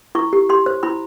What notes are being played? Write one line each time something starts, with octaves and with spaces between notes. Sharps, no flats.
E4 C#6
G4
G4 C6
C5
E4 B5